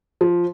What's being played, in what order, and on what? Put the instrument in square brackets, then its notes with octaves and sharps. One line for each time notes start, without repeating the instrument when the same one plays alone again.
[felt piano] F3